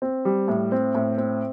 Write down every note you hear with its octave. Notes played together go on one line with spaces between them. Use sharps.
C4
G3
A2
C4
A2
C4